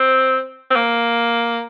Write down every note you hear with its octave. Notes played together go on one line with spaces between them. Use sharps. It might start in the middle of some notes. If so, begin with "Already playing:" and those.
Already playing: C4
C4
A#3